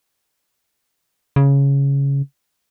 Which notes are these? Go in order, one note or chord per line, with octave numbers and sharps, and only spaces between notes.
C#3